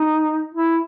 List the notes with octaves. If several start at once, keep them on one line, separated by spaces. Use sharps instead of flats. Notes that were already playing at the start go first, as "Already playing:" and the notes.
Already playing: D#4
E4